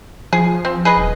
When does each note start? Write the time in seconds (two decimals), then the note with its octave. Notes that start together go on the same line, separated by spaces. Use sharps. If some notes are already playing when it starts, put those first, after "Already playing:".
0.33 F3 G#4
0.65 C4
0.85 G#4 B4 D#5
0.97 D#1